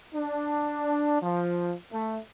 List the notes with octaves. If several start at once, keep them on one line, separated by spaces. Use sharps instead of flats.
D4
F3
A3